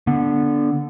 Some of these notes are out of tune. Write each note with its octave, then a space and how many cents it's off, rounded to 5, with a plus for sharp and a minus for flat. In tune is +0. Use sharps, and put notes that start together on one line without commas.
D3 -5 B3 -20